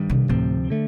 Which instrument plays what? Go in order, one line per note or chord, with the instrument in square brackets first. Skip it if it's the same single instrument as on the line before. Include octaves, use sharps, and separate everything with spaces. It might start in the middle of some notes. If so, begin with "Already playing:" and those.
Already playing: [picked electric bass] G2 D#3 G3
[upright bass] C3
[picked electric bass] D2 C3 F3 C4 [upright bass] A2
[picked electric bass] D3 A3